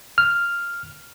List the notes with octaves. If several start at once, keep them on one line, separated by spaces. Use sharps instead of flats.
F6